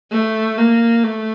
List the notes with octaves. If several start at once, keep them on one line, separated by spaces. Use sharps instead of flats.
A3
A#3
A3